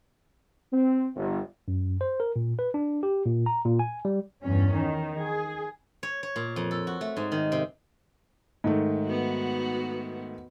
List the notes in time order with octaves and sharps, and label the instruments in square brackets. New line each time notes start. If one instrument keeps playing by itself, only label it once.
[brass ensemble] C4
G1
[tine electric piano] F#2
C5
A#4
A#2
B4
D4
G4
A#2
A#5
A#2
G#5
G3
[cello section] E2 G2 C#4
D#3
G#4
[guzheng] C#5
C#5
A#2
F2
A4
F#4
A3
G#2
D#3
C3
[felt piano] G#2 D#3 A3
[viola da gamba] B3 F#4